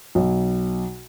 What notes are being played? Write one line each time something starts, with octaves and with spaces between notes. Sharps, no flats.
B1